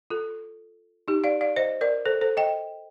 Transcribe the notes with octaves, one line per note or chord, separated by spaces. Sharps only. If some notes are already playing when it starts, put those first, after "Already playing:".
F4 A4
D#4 G4
D5 F5
D5 F5
C5 D#5
A#4 D5
A4 C5
A4 C5
D#5 G5